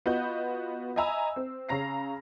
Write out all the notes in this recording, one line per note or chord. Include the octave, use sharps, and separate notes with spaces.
B3 F4 F#4 D#5 G6
D#5 E5 G#5 A#5 B5 E6
C4
C#3 C#4 A#5 A#6 C7